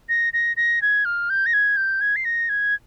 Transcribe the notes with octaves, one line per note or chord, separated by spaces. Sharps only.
A#6
A#6
A#6
G#6
F6
G6
A#6
G#6
G6
G#6
C7
A#6
G#6